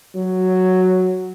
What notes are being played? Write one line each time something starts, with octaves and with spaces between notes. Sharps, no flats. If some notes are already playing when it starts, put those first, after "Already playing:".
F#3